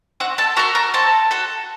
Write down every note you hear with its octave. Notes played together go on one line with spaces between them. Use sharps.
C4 F#4 F#5
A4 A5
F#4 A4 A#4 A#5
A#4 A#5
C4 A4 A5
F#4 A4